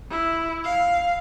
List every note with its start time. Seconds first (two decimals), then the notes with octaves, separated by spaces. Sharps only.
0.10 E4
0.64 F5